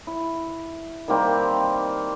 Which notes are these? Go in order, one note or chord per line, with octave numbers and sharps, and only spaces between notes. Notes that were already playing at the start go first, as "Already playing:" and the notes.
E4
D#3 G3 A#3 C4